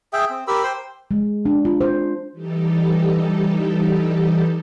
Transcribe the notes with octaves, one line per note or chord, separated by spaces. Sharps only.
G#4 E5 G5
C4
G4 A#4 B5 E6
C5 G5 C6
G#3
D4
F4
C5
E3 G3 D#4 G4 A4